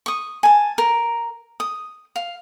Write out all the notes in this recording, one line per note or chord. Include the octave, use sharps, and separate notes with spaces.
C#6 D#6
G#5 A5
A#4
D#6
F5